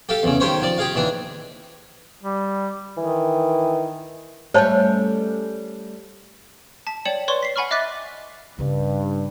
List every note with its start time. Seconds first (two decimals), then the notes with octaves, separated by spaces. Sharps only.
0.09 G4 A4 F5
0.23 E2 C#3
0.40 D#3 G4 C5 C#5
0.62 F3 D5
0.78 G4 G#4 F5
0.95 D#2 E3 D4
2.23 G3
2.97 D#3 E3
4.54 G3 A3 C#4 C5 C#5 A5
6.87 A5 B6
7.05 C#5 D5 G5 C#7 E7 F#7
7.28 B4 C#5 D5 C6 C#6 G7
7.43 B6 C7
7.56 F#5 G#5 B5 C#6 F6
7.71 D#5 E5 D6 F#6 A6 B6
8.59 G2 C#3 C#4